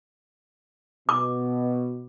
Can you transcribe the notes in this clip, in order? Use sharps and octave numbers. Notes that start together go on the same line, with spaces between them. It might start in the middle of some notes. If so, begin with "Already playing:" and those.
B2 D6